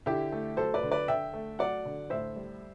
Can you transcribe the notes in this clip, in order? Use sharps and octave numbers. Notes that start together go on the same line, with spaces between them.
D3 E4 G4
A3
F#3 A4 C5
B4 D5
D3
B4 D5
D3 E5 G5
A3
F#3 D5 F#5
D3
A2 C5 E5
G3